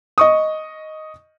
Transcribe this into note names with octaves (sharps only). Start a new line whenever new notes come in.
D#5 C#6 D#6